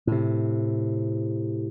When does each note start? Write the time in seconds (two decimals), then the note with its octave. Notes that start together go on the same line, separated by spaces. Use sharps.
0.07 A2 C3